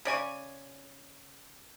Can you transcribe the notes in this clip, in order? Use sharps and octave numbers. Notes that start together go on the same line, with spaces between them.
C#3 D5 G#5 C#6